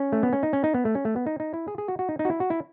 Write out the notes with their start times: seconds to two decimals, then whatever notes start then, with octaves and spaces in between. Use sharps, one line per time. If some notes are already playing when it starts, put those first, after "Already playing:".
Already playing: C#4
0.12 A3
0.23 B3
0.33 C#4
0.43 D#4
0.53 C#4
0.64 D#4
0.74 B3
0.85 A3
0.95 C#4
1.05 A3
1.16 B3
1.27 D#4
1.40 D#4
1.54 E4
1.68 G#4
1.78 G#4
1.88 F#4
1.99 F#4
2.09 D#4
2.19 D#4
2.25 F#4
2.30 E4
2.40 F#4
2.50 E4